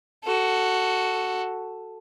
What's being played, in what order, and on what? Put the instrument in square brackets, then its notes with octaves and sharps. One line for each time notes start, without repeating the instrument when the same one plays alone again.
[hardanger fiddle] F#4 A4